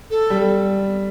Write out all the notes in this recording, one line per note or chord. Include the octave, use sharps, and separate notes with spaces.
A4
G3